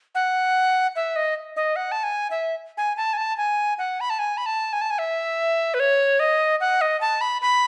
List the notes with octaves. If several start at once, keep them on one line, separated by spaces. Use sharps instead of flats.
F#5
E5
D#5
D#5
F#5
A5
G#5
E5
G#5
A5
G#5
A5
G#5
F#5
B5
A5
G#5
B5
A5
G#5
A5
G#5
E5
B4
C#5
D#5
F#5
D#5
A5
B5
B5